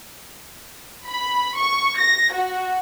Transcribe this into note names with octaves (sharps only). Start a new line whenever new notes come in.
B5
C#6
A#6
F#4